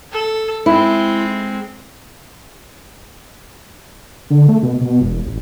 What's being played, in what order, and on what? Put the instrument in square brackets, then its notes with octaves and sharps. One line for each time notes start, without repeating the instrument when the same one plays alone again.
[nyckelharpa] A4
[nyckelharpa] G#3 C4 [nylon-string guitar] E4
[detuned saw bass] D3
A3
B2
B2
E1
A1